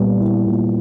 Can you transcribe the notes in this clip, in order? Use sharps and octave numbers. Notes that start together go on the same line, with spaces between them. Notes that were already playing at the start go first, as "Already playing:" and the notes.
Already playing: A#2 G3 B3
E4
A#2